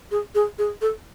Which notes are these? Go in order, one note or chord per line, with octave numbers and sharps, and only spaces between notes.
G#4
G#4
G#4
A4